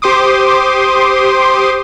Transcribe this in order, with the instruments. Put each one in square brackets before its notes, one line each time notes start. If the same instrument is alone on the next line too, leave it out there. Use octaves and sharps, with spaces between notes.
[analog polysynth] G4 C5 C6 D6 D#6